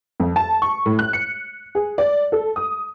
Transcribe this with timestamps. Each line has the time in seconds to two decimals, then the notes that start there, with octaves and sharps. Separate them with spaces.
0.20 F2
0.36 A5
0.62 C#6
0.86 A2
0.99 F#6
1.13 C#7
1.75 G#4
1.98 D5
2.32 A4
2.56 D#6